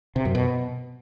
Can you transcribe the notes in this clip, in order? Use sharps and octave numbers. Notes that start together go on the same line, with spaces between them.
C3
F#2
B2